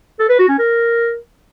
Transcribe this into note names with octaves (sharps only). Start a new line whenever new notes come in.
A4
B4
F#4
C#4
A#4